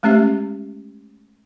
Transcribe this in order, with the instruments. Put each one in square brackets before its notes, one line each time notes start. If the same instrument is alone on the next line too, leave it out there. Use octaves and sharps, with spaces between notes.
[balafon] G#3 A3 C#4 G4 E5